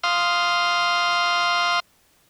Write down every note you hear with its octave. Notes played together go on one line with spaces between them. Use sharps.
F5 C6 D#6 F6